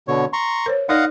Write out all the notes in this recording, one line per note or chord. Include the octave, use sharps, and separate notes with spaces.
B2 D3 C#5
A#5 C6 C#6
A#4 C5 C#5
D#4 A#4 D5 D#5 F5 F#5